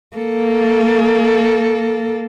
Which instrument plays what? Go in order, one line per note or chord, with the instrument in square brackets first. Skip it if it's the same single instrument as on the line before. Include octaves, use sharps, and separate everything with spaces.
[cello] A#3 A4